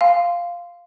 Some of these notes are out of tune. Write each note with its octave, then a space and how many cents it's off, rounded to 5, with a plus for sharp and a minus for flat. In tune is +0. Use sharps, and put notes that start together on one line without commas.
F5 +0 G#5 -20 C6 -10